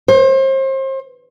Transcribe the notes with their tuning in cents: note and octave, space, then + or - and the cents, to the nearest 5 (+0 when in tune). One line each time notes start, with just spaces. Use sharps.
C5 +35